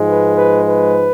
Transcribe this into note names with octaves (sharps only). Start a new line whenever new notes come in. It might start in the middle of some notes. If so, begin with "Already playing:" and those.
Already playing: G#2 F3 G#3
B4
B4
B4